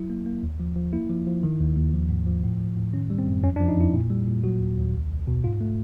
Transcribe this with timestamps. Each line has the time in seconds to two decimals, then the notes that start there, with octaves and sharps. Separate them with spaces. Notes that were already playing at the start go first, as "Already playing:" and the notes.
Already playing: F#3 E4
0.10 A#3
0.26 A#3
0.43 D#2
0.60 F3
0.76 F3
0.93 A#3 E4
1.10 F3
1.27 F3
1.43 D#3
1.60 D#2
1.76 D#2
1.93 F3
2.09 G#2
2.26 F3
2.44 A2
2.60 F3
2.76 A2
2.93 D#3 C#4
3.10 G3
3.19 C4
3.27 F#2
3.43 F2 C#4
3.56 D4
3.60 F3
3.68 D#4
3.77 F2 E4
3.94 A#2
4.10 G3
4.27 A#2
4.44 F#3 F#4
4.60 D#2
4.78 D#2
4.94 C2
5.10 C2
5.27 B2
5.44 G#2 F4
5.61 A3